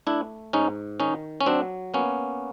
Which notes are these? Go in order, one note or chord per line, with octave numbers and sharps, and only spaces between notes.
A3 D4 E4
G#2 C#4 D#4
D#3 C#4 D#4
C#4
F#3 C4 D4
A#3 B3 C#4